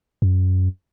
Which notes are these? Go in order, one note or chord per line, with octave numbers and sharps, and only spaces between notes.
F#2